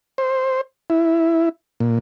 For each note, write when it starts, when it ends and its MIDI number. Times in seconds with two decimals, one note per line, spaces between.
0.18 0.61 72
0.90 1.49 64
1.80 1.99 46